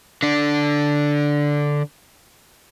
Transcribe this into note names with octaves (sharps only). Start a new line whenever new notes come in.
D3 D4